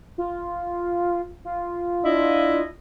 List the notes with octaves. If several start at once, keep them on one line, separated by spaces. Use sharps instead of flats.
F4
F4
D4 E4 D#5